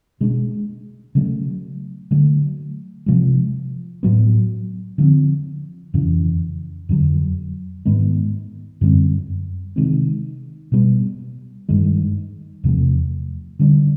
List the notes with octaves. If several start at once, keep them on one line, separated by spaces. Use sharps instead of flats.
B2 G#3 B3 D4
C#3 F#3 A3
D3 F#3 A3
C3 F3 G#3
A2 F#3 B3
D3 F3 A3 C4
F2 C#3 E3
F2 D3 F#3
G#2 D#3 G#3 B3
F#2 D3 G3 C4
C3 D#3 G#3 C4
B2 G3 B3
G2 D#3 G#3
E2 C3 F3 A3
D3 G3 B3 D4